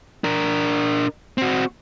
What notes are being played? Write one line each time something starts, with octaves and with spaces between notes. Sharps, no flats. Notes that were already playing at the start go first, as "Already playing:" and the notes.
D4 A#4
C4 F#4